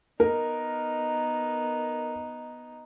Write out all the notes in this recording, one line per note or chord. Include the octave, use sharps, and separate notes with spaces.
B3 D#4 A#4